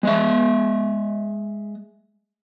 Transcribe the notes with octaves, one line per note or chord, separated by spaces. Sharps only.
G#3 D#5 E5